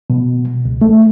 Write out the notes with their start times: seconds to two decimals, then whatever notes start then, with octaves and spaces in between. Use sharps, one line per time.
0.10 B2
0.65 C#2
0.81 A3